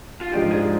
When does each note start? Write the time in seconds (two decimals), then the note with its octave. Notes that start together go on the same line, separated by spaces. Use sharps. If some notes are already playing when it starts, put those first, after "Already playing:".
0.21 F4
0.32 G#2 F3 G#3 D4 F4 G4
0.52 G#4